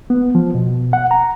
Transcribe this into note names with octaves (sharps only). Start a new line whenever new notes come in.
B3
F3
B2
F#5
A#5